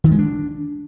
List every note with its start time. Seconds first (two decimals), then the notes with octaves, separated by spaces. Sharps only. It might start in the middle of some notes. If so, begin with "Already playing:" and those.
0.04 D#3
0.11 G#3
0.19 D4